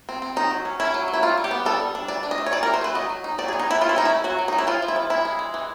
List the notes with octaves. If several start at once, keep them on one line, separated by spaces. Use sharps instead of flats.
C4
C4
D#3 D#4
F#3
C#4
C#4 E4
F#3
F#3
E4
G3 F4
G3
G4
B3
G3 A4
G3
D4
E3 D5
D4
D#5
A3
C#5
E3 D5
A#4
E3
C5
A3 B4
F#3 D#5
F#3
D#4
F#3 D5
G#4
B3
D#4
B3 E4
F#3 F4
E4
C#4 D#4
E4
A3
F#3 F#4
F#3
D#4
F#3
E4
F3 F4
F3
E4
F3
G#3 E4
G#3
G#3
E3